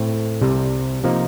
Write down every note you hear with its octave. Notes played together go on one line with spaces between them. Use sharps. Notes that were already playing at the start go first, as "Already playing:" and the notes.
Already playing: A2 A3 C4
C2 C3 G3
C3 F3 A#3 D#4